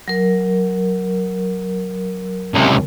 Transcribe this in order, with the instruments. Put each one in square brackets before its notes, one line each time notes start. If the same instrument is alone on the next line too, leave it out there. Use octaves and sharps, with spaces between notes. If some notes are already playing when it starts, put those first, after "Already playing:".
[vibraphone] F#3 A#4
[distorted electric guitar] C#2 C3